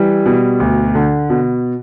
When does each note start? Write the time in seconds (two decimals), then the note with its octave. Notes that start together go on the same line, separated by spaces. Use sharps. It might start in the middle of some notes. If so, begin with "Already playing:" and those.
Already playing: E3 G3
0.26 B2
0.60 D2
0.95 D3
1.30 B2